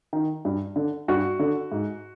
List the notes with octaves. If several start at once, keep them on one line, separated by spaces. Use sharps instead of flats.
D#3
G2
D3
G2 F#4
D3
G#2